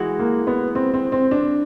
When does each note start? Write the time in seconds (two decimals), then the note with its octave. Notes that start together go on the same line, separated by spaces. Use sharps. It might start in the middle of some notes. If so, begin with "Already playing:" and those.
Already playing: E3 G#3 F#4
0.19 A#3
0.47 B3
0.75 C4
0.94 C4
1.12 C4
1.31 D4